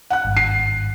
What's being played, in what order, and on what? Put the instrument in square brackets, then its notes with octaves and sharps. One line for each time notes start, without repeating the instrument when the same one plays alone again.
[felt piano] F#5 F#6
[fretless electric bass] G#1 G2
[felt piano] C7